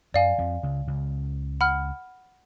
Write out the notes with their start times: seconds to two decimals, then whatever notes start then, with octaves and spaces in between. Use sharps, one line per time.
0.14 F#2 F#3 D5 F5 G#5
0.38 F2 F3
0.63 C#2 C#3
0.87 C#2 C#3
1.61 F#5 B5 F6